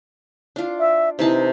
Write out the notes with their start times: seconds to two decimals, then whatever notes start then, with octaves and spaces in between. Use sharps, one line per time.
0.56 D4 F4
0.79 E5
1.19 C3 E3 D#4 A5